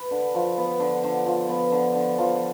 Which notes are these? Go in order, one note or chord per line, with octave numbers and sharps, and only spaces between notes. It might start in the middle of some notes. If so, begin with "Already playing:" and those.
Already playing: B4
D3
F3
B3
D3
D3
F3
B3
D3
D3
F3